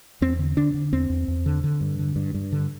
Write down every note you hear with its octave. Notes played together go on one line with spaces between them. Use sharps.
E2 C4
D3
D3 D4
D3
E2 C4
E2
E2
D3
D3
G2
D3
G2
G2
D3